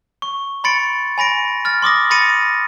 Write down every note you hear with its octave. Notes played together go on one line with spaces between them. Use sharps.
C#6
B5 C6 A6 C#7 D7
G#5 B5 A#6 D7
F6 A6
C6 D6 D#6 A#6
B5 C6 A6 A#6 C#7 D#7